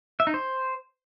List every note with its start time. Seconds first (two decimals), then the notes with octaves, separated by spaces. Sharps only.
0.20 E5
0.27 D#4
0.34 C5